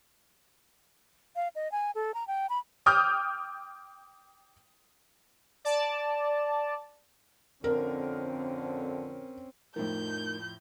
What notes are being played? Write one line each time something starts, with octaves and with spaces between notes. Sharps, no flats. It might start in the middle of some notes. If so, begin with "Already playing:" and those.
F5
D#5
G#5
A4
A#5
G5
B5
G5 D6 D#6 F6 G6
D5 A5
F2 D3 C4 C#4 A#4
F2 A2 F3 A3 D#4 A#4 G6